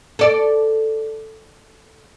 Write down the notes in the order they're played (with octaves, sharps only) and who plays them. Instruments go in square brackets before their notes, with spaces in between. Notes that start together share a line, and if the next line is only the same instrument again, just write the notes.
[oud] A4 D5